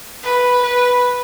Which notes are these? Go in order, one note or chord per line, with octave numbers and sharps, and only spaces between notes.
B4
B4